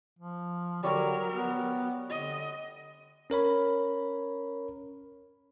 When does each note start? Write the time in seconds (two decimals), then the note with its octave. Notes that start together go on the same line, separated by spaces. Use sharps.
0.19 F3
0.83 D3 F#3 G3 A#4 C#5 C#6
1.32 B3
2.10 D3 D#5
3.30 C#4 A#4 C#5 B5